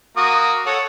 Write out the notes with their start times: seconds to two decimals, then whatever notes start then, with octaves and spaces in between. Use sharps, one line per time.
0.17 A#3 F#4 D#6
0.66 A4 C#5 F#5